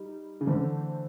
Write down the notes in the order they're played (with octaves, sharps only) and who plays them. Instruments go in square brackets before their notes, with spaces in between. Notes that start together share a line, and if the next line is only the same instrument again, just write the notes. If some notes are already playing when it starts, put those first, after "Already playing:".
Already playing: [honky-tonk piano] G3 D#4
[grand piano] C#3
[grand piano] D3 [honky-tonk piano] E3 A3 C4